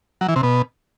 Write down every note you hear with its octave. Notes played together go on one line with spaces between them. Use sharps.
F#3
E3
C3
B2